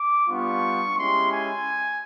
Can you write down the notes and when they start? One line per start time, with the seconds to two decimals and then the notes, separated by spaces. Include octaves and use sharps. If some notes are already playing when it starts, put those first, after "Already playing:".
Already playing: D6
0.28 G3 B3 D4 F4 C#6
0.97 G#3 C#4 E4 G4 C6
1.32 G#5